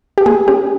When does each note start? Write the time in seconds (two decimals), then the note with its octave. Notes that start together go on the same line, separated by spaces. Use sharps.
0.18 G4
0.26 A#3 G#4
0.48 C#4 G4